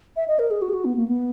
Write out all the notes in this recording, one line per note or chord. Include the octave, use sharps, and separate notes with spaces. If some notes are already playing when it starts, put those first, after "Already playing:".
E5
D#5
A#4
G#4
F#4
G#4
F#4
B3
A#3
B3